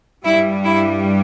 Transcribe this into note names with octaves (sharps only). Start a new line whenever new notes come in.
G2 G3 E4
E4